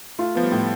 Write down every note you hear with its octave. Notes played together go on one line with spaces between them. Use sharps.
A3 F4
F3 B3
G3
A2